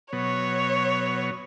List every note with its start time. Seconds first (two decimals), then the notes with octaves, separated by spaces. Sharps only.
0.13 B2 F#3 B3 C#5